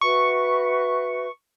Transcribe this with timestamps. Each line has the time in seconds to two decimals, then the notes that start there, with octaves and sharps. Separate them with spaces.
0.01 F#4 B4 E5 C#6